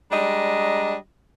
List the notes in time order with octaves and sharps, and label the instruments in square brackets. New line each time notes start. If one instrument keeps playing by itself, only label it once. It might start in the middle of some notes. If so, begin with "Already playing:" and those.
[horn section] G3 G#3 D4 D#5 A#5